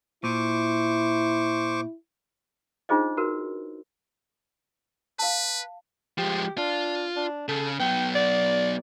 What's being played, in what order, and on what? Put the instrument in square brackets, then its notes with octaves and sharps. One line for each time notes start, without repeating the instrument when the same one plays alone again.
[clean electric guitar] A#2 [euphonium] E4 [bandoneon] C5 C#6 D6
[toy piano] D4 D#4 F4 G#4 C5 D#5
F#4 A#4 B4
[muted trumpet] B4 [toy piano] F5 A5
[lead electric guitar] F3 G#3 [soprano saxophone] G4
[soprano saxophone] D4 [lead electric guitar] F4
[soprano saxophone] D4
[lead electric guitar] C#3 [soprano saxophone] A4
[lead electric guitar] F#3 B3 [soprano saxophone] G5
[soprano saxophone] D5